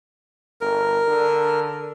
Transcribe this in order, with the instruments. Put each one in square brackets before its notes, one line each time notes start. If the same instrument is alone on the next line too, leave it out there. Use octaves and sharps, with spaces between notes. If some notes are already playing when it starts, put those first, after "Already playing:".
[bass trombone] G1 [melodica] A#4
[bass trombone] D3